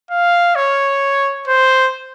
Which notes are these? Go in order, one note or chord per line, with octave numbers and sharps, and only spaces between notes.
F5
C#5
C5